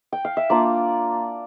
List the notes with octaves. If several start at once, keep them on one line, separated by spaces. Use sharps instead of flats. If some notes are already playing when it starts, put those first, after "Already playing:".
G5
F5
E5
A#3 D4 F4 D5